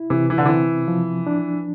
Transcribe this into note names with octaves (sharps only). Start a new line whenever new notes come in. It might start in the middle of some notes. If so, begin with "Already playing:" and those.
Already playing: E4
C3 E3
E3
D3
E3 C4
F3
D4